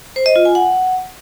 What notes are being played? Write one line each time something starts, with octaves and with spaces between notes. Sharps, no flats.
C5
D#5
F4
G#5
F#5